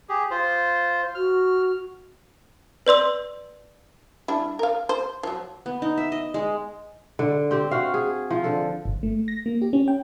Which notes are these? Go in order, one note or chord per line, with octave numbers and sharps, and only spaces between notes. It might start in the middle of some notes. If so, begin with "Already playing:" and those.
G4 G#4
F4 C5
F#4 F6
B4 D5 C6 E6
G3 D4 E4
A#4 F5
C5
F3 F#3
B3
D#4
E5
D#5
G#3
D3
C4 G4
F#4 F5
G#4
F3
D3 A4
G1
A3
A#6
A#3
G4
C#4
G5